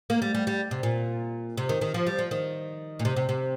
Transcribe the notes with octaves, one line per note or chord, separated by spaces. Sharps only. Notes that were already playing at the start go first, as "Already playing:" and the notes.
A#3
G3
G3
G3
C3
A#2
C3
D#3
D#3
F3
G3
F3
D#3
A#2
C3
C3
C3